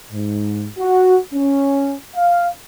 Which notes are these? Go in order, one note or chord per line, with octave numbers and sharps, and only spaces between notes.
G#2
F#4
C#4
F5